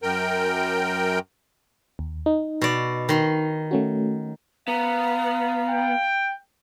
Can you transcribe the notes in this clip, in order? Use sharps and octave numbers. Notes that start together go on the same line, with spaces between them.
F#2 A#4 G5
D#2
D#4
B2 D5
D#3 C6
A3 C#4 F#4
B3 F5 A#5
G5